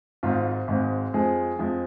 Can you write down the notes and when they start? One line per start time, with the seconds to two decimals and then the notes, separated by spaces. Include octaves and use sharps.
0.23 G#1 G#2 G#3 F4
0.68 G#1 G#2 G#3
1.14 F2 F3 G#3 G#4
1.59 F2 F3 G#3